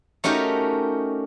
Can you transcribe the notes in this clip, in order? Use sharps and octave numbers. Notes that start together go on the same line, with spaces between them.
A3 C#4 D#4 F#4 G4 A#4